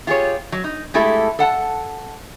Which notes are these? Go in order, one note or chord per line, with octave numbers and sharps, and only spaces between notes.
F4 G4 G#4 C#5
F#3
D#4
G#3 A3 E4 G4 A4
A4 F#5 A5